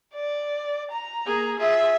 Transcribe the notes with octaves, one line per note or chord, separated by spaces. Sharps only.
D5
A#5
A#3 G#4
F4 G#4 E5